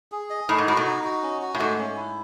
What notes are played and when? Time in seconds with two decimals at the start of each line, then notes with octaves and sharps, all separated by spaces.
0.12 G#4
0.30 D#5
0.49 A2 D#4
0.58 G#2
0.68 A2 F#4
0.77 B2
0.86 D#4
1.04 F#4
1.23 C#4
1.42 F#4
1.55 A2
1.59 G#2 A3
1.78 C#4
1.97 E4